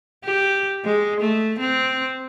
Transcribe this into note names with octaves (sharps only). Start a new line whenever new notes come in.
G4
G#3
A3
C4